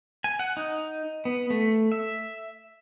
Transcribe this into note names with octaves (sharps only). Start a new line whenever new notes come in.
G#5
F#5
D#4
B3
A3
E5